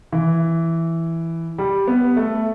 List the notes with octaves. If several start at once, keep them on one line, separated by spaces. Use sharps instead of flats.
E3
G3
B3
A3